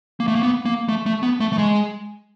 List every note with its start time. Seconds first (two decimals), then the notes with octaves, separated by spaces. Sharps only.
0.20 A#3
0.28 A3
0.35 A#3
0.43 B3
0.65 A#3
0.89 A3
1.06 A3
1.23 B3
1.40 A3
1.53 A3
1.58 G#3